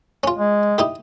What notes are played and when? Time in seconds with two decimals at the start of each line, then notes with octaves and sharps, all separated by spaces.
0.24 C#4 F4
0.37 G#3
0.78 D#4 E4 G4